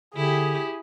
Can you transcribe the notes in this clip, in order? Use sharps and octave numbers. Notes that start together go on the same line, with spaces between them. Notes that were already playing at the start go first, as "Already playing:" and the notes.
D3 E4 G4 G#4